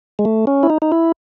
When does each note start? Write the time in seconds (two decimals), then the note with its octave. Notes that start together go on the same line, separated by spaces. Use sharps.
0.19 G#3
0.25 A3
0.47 C#4
0.63 E4
0.70 D#4
0.82 D#4
0.92 E4